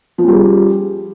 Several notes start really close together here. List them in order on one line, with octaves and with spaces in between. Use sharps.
F3 C#4 G3 G#4